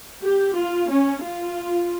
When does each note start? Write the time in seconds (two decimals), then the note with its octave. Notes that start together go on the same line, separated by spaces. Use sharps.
0.23 G4
0.57 F4
0.89 C#4
1.24 F4